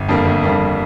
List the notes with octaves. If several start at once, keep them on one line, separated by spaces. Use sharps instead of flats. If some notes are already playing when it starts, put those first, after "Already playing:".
Already playing: G1
F2 D3 G3 A#3
G1
F2 D3 G3 A#3